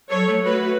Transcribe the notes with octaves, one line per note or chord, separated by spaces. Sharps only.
F#3 A4 C#5
A3
A3 F#4 B4